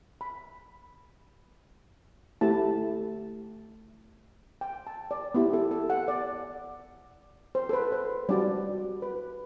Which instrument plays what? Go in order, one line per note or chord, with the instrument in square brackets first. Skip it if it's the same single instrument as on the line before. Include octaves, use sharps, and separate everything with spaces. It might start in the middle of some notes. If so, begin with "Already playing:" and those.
[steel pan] B5
A3 E4 G4 A5
G5
A5
D5
B3 E4 G4
A4
A4
F#5
D5
C5
A4
B4
C5
G3 D4 F#4 D5
B4